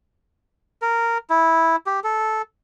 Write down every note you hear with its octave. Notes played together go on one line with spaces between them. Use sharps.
A#4
E4
G4
A4